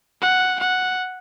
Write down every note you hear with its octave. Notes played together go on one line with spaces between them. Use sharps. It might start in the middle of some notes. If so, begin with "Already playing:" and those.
F#5
F#5